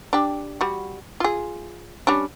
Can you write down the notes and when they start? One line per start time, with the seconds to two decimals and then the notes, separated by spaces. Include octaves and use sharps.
0.13 D4 G4
0.61 G3 F#4
1.20 F4 G#4
2.07 G3 C#4 D4